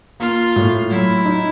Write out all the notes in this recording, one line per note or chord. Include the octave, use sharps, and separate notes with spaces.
A#3 F4
A2
F#3 E4
D#4